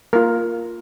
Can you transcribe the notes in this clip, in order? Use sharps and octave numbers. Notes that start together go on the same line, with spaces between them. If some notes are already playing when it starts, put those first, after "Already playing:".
A#3 F4 A#4